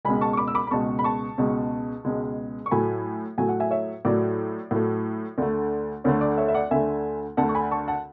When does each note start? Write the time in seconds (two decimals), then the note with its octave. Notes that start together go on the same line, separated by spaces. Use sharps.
0.05 C#2 B2 G#3 G#5 B5
0.21 A5 C#6
0.33 C#6
0.37 B5 D6
0.48 E6
0.55 B5 D6
0.67 B5
0.71 C#2 B2 G#3 A5 C#6
0.99 B5
1.04 A5 C#6
1.38 C#2 B2 G#3
2.05 C#2 B2 G#3
2.66 C#6
2.71 A2 F#3 A3 G#5 B5
3.38 A2 F#3 A3 G#5
3.49 F#5
3.60 E5 G#5
3.71 C#5 E5
4.05 A2 F#3 A3 D5
4.71 A2 F#3 A3
5.38 D2 D3 A3
6.04 D2 D3 A3 C#5
6.21 D5
6.38 C#5 E5
6.48 E5
6.54 D5 F#5
6.71 D2 D3 A3 E5 G#5
7.37 D2 D3 A3 F#5 A5
7.49 C#6
7.55 G#5 B5
7.71 A5 C#6
7.88 F#5 A5